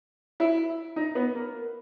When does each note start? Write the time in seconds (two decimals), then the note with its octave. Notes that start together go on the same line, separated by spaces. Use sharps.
0.40 E4
0.96 D#4
1.15 B3
1.35 A#3